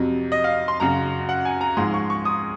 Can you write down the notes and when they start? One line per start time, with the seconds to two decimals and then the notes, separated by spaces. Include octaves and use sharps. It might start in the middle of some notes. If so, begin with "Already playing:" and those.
Already playing: F2 C3 F#3
0.32 D#5
0.44 F5
0.68 C6
0.80 F#2 C#3 F#3 A#5
1.29 F#5
1.45 G#5
1.61 A#5
1.77 G#2 F3 G#3 C6
1.94 C#6
2.10 C#6
2.25 D#6